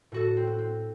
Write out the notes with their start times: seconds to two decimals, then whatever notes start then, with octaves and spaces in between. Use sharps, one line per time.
0.12 A2 F#4 A4
0.37 C4
0.47 F#4
0.58 C4